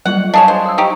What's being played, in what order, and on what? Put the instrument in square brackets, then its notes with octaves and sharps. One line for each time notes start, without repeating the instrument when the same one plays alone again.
[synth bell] F#3 G3 F4 [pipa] F#5
[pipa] D4 G#4 C#5 [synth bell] D#5 F5
[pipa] C5
[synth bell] D#6 E6
[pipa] D#4 G4 [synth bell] C#6